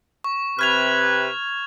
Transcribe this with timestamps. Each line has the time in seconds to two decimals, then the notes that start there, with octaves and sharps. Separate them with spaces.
0.24 C#6
0.59 C3 B4 F6 G#6 F7